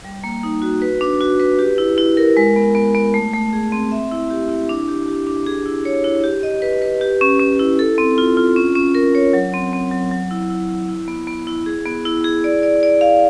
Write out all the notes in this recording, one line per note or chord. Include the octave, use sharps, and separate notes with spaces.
G3
A#3
D#4
F#4
B4
D4
F#4
B4
G4
E4
E4
A#4
G#3
B3
B3
B3
A3
A3
G#4
C4
E5
E4
G4
E4
D4
G4
G4
D4
G#4
E4
C#5
E4
G4
D#5
B4
B4
G4
C#4
C#4
E4
A4
C4
F4
F4
C#4
C#4
A#4
C#5
F#3
C4
C4
F#3
F#3
E4
E4
E4
E4
B3
B3
E4
G#4
B3
E4
G#4
D5
D5
D5
F5